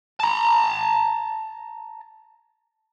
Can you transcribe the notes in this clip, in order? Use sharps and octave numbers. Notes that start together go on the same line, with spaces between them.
A5 A#5